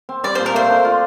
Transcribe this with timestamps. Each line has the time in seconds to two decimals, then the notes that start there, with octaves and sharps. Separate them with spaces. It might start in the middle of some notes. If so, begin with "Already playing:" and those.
0.09 C4
0.24 G3 D5
0.35 A#2 C5
0.46 A#4
0.54 A3 C5
0.70 D4
0.85 F4